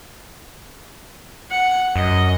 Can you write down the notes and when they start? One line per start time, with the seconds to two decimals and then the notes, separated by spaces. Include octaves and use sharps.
1.51 F#5
1.96 F#2 D#5